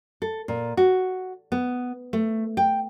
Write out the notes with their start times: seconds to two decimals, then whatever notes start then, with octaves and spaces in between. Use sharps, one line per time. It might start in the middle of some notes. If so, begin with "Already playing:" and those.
0.22 A4
0.48 A#2
0.77 F#4
1.52 B3
2.13 A3
2.57 G5